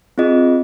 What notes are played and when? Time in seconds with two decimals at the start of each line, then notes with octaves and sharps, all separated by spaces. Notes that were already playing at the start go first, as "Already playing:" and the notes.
0.18 C4 F4 G#4 D#5